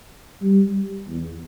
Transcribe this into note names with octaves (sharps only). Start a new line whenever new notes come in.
G3
E2